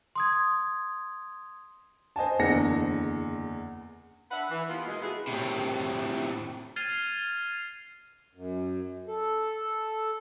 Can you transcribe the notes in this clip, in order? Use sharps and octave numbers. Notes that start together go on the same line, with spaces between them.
C6 D#6 G#6
C5 D#5 G#5 A5
F#1 E2 D3 A#6 C#7
D4 B4 E5 F#5
E3
D#2 A#3 B3 F4
B2 E3 G#3
A2 B3 D#4 E4 F#4 G#4
A2 C3
F6 G#6 A6 C7 D#7 F7
F#2
A4